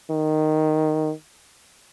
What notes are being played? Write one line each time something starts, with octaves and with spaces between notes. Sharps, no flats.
D#3